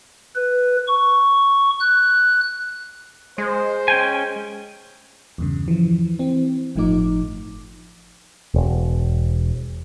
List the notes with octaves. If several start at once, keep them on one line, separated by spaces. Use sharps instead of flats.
B4
C#6
F#6
G#3 C5
C#4 G5 G#5
E2 G2 C#3
E3 F3
E3 C4
G1 A2 F3 A3 D#4 D6
E1